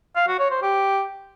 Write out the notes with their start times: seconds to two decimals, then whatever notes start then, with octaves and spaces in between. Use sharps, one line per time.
0.16 F5
0.27 F#4
0.39 C#5
0.51 C5
0.62 G4